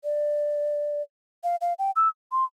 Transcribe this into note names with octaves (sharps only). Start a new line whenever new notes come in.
D5
F5
F5
G5
E6
C6